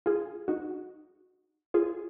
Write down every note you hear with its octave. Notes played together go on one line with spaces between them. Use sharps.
F4 G#4
D#4 F#4
F4 G#4